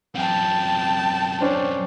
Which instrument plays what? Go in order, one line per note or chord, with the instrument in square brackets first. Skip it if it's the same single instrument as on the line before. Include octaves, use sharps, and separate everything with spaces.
[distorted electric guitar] F#2 C4 [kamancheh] G5 A5
[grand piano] C#4 D4 C5